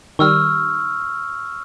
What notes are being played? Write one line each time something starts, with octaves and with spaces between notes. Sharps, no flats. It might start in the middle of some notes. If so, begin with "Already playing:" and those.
D#3 G3 C#6 E6 F6